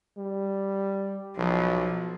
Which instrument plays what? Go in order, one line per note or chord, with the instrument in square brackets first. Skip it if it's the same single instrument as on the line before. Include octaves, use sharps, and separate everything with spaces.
[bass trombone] G3
[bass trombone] B1 [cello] F3